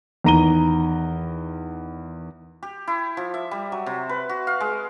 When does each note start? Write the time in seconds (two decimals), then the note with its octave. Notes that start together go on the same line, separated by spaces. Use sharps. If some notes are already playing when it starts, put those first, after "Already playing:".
0.24 E2 D#3 A#5 D#7 G7
2.63 G4
2.88 E4
3.17 F3
3.34 E5
3.51 G3
3.72 F#3
3.86 C3
4.09 B4
4.29 F#4
4.47 F5
4.60 G#3